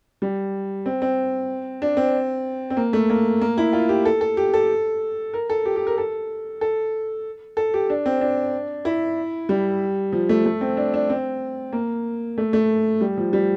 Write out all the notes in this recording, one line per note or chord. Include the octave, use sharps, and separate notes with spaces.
G3
C4
C4
D4
C4
C4
A#3
A3
A#3
A#3
E4
F4
G4
A4
A4
G4
A4
A#4
A4
G4
G4
A#4
A4
A4
A4
G4
D4
C4
D4
E4
G3
F3
A3
A3
C4
D4
D4
C4
A#3
A3
A3
G3
F3
G3